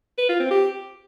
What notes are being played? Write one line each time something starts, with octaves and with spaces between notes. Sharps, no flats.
B4
F4
C4
G4